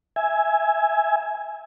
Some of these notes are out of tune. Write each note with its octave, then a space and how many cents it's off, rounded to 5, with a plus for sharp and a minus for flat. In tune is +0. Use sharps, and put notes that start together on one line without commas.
E5 +0 G#5 +0